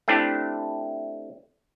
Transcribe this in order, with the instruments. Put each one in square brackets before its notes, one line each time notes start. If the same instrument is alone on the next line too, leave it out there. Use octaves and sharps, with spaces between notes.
[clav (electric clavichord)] A3 C4 D4 E4 G4